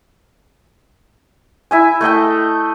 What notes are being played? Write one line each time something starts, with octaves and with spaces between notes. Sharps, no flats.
E4 E5 G#5
A3 A4 D#5 G5